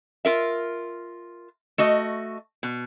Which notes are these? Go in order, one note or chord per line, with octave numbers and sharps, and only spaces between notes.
F4 A#4 E5
A3 F#4 D#5
B2